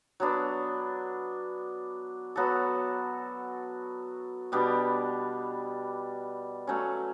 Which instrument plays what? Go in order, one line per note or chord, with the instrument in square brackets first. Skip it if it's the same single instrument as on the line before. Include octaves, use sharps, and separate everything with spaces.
[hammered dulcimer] F#3 B3 D4
F#3 B3 F#4 A4
B2 G3 B3 D4
F#3 A3 C#4